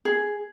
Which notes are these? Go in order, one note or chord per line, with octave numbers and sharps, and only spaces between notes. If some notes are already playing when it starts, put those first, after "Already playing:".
G#4